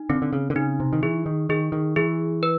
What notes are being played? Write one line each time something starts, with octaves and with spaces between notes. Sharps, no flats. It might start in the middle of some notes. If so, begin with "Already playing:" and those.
Already playing: D#4
D3 C4
D3
C#3
D3
C#3 D#4
C3
D#3
E3 G#4
D#3
D#3 G#4
D#3
E3 G#4
B4